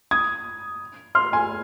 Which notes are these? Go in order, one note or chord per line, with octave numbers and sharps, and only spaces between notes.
D#6 G#6
C6 F6
G#5 C6